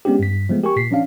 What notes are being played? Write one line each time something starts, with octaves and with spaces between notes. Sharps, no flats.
G#3 B3 C#4 D4 G4
G2 B6
F3 G#3 A3 B3
G4 A#4 G#5 C#6
A#2 B6 C7
F3 C#4 D4 F5